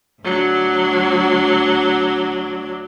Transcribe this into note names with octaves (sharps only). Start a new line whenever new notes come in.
D2 F#3 D4